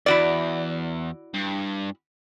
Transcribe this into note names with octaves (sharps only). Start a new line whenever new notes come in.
E2 E4 F#4 D5
G2